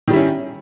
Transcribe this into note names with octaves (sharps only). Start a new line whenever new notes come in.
D#3 G3 C#4 E4